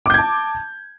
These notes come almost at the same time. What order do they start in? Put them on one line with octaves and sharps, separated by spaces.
D6 G6 G#6 A5